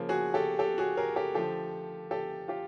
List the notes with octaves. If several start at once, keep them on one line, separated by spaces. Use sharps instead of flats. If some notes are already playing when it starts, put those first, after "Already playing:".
Already playing: C#3 F3 A#3
F#4 G#4
G4 A4
G4 A4
F#4 G#4
G#4 A#4
G4 A4
D3 F3 A3 G4 A4
G4 A4
F4 G4